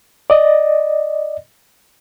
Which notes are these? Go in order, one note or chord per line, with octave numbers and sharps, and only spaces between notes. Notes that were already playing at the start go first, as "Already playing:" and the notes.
D5 D#5